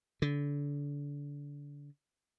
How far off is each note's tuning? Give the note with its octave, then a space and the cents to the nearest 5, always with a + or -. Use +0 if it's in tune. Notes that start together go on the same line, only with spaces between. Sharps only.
D3 -30